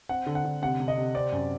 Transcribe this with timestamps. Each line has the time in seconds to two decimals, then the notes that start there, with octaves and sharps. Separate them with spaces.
0.09 C4 F#5
0.26 D3
0.35 F#5
0.45 D3
0.62 C3 F#5
0.80 C3
0.88 D#5
0.98 C3
1.14 C4 D5
1.32 F#2